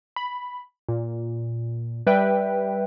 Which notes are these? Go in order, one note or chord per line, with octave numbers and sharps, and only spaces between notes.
B5
A#2
G3 B4 E5 G5